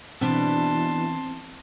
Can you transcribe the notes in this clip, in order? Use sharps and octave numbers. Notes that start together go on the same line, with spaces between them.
B2 E3 B3 C4 D4 A5 C6